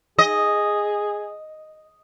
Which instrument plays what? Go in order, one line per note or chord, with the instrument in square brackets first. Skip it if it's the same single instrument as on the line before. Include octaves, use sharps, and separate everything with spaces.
[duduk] G#4 [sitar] D#5